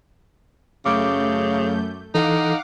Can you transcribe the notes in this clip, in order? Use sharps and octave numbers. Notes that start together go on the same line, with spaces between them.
F#2 C#3 A3 D6 G6
E3 D#4 A4 F5 F#5 D6